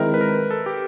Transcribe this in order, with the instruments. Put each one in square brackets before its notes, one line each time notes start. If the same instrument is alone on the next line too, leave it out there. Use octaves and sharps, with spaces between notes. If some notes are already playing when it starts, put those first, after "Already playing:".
Already playing: [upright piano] D#3 G#3 C4 E4 [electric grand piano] A#4
[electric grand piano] B4
A#4
A4
G4